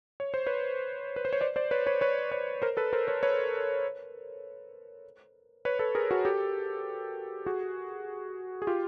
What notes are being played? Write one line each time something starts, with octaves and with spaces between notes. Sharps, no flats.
C#5
C5
B4 C#5
B4
C5
C#5
C5 D5
C5 D5
B4 C#5
B4 C#5
B4 C#5
B4 C#5
A#4 C5
A4 B4
A#4 C5
B4 C#5
B4 C#5
B4 C#5
A4 B4
G#4 A#4
F#4 G#4
G4 A4
F#4 G#4
G#4
F4 G4